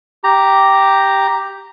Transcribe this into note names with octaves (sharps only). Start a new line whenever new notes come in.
G4 A#5